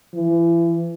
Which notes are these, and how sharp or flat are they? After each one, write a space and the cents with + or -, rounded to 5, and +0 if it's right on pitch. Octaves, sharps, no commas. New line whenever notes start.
E3 +35